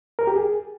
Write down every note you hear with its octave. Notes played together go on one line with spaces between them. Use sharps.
A#4
G4
G#4